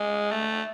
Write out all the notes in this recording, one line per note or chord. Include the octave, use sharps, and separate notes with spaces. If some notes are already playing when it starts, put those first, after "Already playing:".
Already playing: G#3
A3